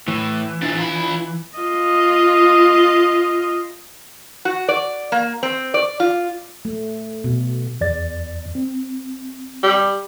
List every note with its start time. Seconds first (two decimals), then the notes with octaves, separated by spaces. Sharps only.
0.08 A2 E3
0.63 D4 F4
0.78 F4 B5
1.59 F4 D#5
4.45 F#4
4.69 D5
5.12 A#3
5.43 C4
5.74 D5
6.00 F4
6.65 A3
7.24 B2
7.81 E2 D5 A6
8.55 C4
9.63 G3